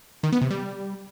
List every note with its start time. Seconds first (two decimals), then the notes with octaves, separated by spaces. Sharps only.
0.23 D#3
0.32 B3
0.41 C3
0.50 G3